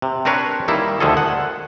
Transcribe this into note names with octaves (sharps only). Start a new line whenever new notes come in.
C3
C4 D4 A#4 B4 C#5
D#3 G3 A#3 E4
D2 D3 D#3 F3 G#4 A4
F#5